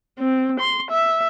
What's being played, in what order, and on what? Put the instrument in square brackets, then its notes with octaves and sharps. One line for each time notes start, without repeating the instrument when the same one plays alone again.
[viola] C4
C6
E5